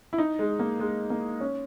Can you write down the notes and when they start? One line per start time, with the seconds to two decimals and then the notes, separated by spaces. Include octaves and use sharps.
0.13 E4
0.18 D#4
0.39 G#3
0.59 A#3
0.80 G#3
1.10 A#3
1.40 C#4